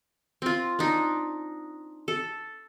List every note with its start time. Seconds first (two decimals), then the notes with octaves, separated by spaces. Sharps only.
0.42 C4 F4
0.79 D4 D#4
2.08 A4